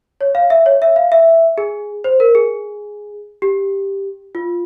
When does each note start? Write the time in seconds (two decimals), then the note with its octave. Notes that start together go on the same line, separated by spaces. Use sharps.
0.21 C#5
0.35 F5
0.50 E5
0.66 C#5
0.82 E5
0.96 F5
1.12 E5
1.58 G#4
2.04 C5
2.20 A#4
2.35 G#4
3.42 G4
4.35 F4